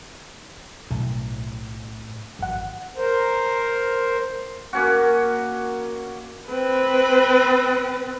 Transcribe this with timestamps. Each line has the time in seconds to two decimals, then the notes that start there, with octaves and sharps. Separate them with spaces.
0.91 B1 A2
2.39 G#1 F#2 F#5
2.97 A#4 C5
4.73 A#3 C#4 F#4
6.49 C4 B4